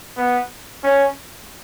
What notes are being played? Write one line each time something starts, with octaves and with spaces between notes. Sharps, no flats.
B3
C#4